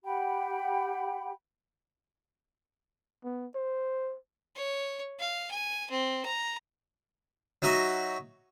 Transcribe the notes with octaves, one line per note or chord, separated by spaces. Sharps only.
G4 F#5 G5 B5
B3
C5
C#5
F5
G#5
C4
A#5
F#3 D#4 F#4 E5